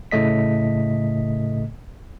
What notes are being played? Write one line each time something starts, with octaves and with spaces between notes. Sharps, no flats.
A2 C#3 A3 D#5 B6